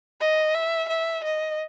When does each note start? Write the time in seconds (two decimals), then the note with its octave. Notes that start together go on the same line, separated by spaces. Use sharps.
0.20 D#5
0.55 E5
0.89 E5
1.23 D#5